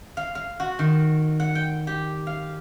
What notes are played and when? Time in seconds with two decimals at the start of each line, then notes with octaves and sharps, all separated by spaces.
0.17 F5
0.35 F5
0.60 F#4
0.79 D#3
1.40 F#5
1.55 G5
1.87 G4
2.27 F5